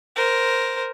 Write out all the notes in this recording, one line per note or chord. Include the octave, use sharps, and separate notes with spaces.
A#4 C5